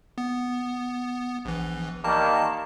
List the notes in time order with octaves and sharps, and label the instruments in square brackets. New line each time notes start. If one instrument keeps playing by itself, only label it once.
[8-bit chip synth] B3
A#1 E3
[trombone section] D#3 G3 A#3 [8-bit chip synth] A5